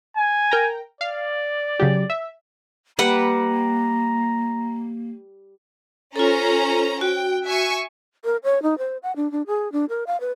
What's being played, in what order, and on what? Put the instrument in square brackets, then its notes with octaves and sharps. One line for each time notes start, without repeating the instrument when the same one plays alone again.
[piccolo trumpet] G#5
[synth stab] A#4 G5 A#5
[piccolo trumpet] D5 [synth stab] F5
[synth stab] C#3 F#3 G4
E5
[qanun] G3 B4 F#5 [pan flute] A#3 [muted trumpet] A#5
[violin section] C#4 C5 A#5 [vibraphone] F4 A4
[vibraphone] F#4 [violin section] G5
[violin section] E5 G#5 C#6
[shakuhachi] A#4
C#5
D#4
C5
F#5
D4
D4
G#4
D4
A#4
F5
B4